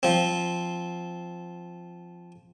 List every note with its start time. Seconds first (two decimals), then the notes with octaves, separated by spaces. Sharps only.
0.03 F3 C4